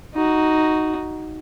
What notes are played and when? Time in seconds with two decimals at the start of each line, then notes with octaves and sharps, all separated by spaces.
0.14 D#4 F#4